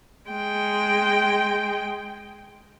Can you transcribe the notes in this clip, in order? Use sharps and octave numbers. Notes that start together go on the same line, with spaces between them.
G#3 G5